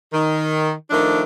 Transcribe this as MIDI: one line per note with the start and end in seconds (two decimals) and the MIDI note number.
0.13 0.71 51
0.91 1.22 51
0.91 1.22 53
0.91 1.22 57
0.91 1.22 62